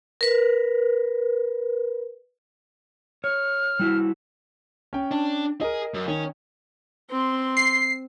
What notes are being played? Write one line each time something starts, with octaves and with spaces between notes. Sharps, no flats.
A#4 B4
C#5 F6
G3 E4 F#4
C#4 G5
D4
G#4 A#4 D#5
F#2
D#3 C#4
C4 C6
C7